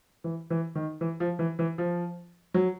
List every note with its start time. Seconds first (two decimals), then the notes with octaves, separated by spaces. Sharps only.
0.24 E3
0.50 E3
0.75 D#3
1.01 E3
1.20 F3
1.39 E3
1.59 E3
1.78 F3
2.54 F#3